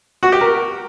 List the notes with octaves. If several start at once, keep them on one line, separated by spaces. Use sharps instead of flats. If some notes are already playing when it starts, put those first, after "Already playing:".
F#4
G4
A#4